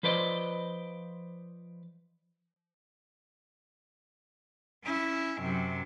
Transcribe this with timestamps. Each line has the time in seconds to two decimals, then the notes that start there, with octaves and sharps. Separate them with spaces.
0.03 F3 B4 C5 D5 D#5
4.84 C#4 E4
5.41 F#2 C3